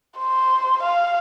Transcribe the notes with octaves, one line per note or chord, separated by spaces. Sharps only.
C5
F5